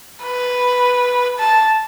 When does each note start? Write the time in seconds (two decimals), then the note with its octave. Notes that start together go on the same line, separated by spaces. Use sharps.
0.24 B4
1.39 A5